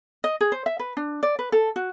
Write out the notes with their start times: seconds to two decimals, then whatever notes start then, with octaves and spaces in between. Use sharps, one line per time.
0.24 D#5
0.41 G#4
0.52 C5
0.66 E5
0.79 B4
0.97 D4
1.23 D5
1.39 B4
1.52 A4
1.76 F#4